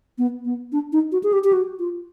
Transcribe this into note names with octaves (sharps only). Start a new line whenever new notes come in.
B3
B3
D4
D#4
F#4
G#4
G4
G4
F#4
F4